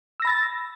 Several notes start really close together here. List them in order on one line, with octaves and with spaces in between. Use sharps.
E6 A#6 B5 A6